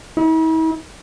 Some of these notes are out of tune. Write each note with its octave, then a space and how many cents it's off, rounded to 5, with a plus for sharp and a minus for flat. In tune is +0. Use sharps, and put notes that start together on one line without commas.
E4 -45